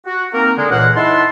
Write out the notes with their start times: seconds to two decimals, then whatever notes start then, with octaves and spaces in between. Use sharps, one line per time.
0.07 F#4
0.34 A#3 C4 D#4 A#4
0.58 D3 G#3
0.71 C#2 A#2 E3 A#3 F#5
0.96 D#4 E4 E5 F#5 A5 C6